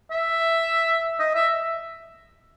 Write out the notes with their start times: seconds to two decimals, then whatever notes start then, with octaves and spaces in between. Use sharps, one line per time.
0.11 E5
1.20 D#5
1.35 E5